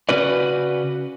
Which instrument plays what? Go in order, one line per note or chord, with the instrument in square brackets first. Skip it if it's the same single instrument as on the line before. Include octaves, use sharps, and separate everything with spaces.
[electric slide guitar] C#3 C#4 F#4 B4 D5